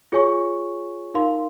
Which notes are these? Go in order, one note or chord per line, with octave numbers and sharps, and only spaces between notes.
F4 G#4 C#5 G#5 C#6
D#4 A#4 F5 C6